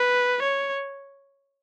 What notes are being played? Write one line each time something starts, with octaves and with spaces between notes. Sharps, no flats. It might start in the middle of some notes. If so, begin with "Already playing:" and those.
Already playing: B4
C#5